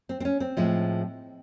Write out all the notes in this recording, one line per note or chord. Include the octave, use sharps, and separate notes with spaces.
C4
C4
C#4
C4
A2 F3 G#3